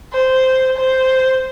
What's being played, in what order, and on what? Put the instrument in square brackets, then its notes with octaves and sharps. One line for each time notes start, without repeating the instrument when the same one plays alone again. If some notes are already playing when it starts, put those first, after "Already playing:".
[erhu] C5
C5